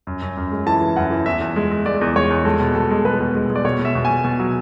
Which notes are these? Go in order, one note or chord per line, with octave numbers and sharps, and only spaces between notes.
F#2
F#2
F#2
G#3
E3 A5
E3
F#2 F#5
E3
E2 E5
E2
G#3
G#3
G#3 D5
E2
G#3 C#5
E2
G#3 A4
B2
B2 A4
G#3
G#3 B4
B2
G#3
G#3
D5
B2 C#5
B2
E5
B2
G#5
B2
B2
F#3